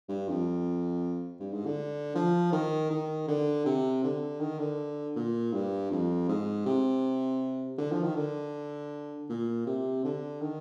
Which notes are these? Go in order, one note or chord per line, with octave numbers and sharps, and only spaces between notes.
G2
F2
G2
G#2
D3
F3
D#3
D#3
D3
C3
D3
D#3
D3
A#2
G2
F2
G#2
C3
D3
F3
D#3
D3
A#2
C3
D3
D#3